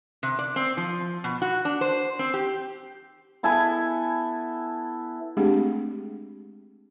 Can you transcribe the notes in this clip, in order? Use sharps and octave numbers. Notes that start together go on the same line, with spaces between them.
C3
D5
C4
F3
B2
F#4
D4
C5
C4
G4
B3 E4 A4 G#5
G#3 A3 C4 D4 G4 G#4